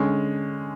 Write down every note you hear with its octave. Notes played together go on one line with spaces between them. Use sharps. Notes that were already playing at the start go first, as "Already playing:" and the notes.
Already playing: D3 G#3 C#4